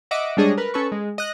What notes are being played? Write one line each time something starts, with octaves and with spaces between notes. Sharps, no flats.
D#5 E5 F#5 D6
G3 G#3 D4 G#4 C#5 D#5
A#4 B4
C#4 A4 B4 C#6
G#3
D#5 F#6